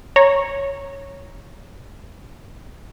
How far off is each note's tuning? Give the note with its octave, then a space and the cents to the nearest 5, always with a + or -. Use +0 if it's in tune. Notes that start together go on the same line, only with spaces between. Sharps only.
C#5 +0 A#5 +0